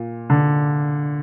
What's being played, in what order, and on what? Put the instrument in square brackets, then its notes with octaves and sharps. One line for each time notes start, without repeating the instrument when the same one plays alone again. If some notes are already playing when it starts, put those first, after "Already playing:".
Already playing: [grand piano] A#2
D3